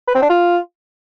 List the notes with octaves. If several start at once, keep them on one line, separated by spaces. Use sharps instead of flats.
B4
C4
D4
F4